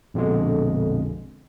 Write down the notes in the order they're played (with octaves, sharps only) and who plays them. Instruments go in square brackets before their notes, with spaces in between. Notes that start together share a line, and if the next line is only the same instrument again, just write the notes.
[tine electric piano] A#1 F2 B2 D3 G#3